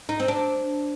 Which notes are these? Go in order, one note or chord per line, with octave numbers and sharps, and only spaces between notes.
D#4
C4
D4